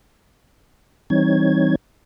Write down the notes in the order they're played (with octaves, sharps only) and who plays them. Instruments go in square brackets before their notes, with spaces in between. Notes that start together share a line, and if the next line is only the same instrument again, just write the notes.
[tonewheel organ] E3 G3 C4 D#4 C#5 G#6